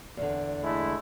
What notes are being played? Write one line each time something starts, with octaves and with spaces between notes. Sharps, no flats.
E2 D3
G#3 A3 E4